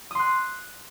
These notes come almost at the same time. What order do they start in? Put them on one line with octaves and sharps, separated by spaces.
D#6 C6 F#6